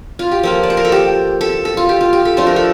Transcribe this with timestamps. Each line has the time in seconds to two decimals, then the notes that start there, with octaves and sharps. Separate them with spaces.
0.19 F4
0.31 G4
0.43 F3 A#3 F4 A4
0.63 D5
0.70 C5
0.77 A#4
0.85 A4
0.92 G4
1.41 A4
1.65 A4
1.77 F4
1.89 G4
2.01 F4
2.13 G4
2.25 A4
2.37 F3 A3 D4 F4 C5
2.47 A#4
2.56 A4